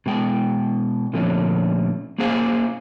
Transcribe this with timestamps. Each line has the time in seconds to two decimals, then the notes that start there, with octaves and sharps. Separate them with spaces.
0.06 B2 G#3 G5
1.13 A#2 D3 F3 A3 C4 C#4
2.19 A#3 C#4 G#4 C5 F5 G#5